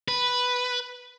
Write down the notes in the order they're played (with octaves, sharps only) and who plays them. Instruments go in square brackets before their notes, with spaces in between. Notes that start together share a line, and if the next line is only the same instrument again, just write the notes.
[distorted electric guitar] B4